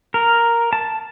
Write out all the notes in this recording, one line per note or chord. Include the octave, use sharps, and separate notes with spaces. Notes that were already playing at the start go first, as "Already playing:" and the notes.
A#4
A5